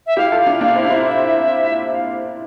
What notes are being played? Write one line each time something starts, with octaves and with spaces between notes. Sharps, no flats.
E5
E4 G4 F5
F4 A4
F5
D4 F4
A#3 D4 F5
C4 E4
D4
C4 E4
E5
E5
F5